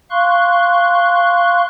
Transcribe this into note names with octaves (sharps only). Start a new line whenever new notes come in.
F5 C6 C#6 F#6